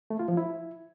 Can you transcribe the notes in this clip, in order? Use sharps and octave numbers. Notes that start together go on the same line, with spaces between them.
A3
F4
F3
E4